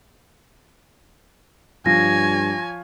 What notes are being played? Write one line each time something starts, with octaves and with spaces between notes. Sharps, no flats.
G2 F3 C#5 G#5 A#6